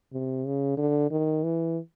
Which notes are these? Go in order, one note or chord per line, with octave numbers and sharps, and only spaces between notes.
C3
C#3
D3
D#3
E3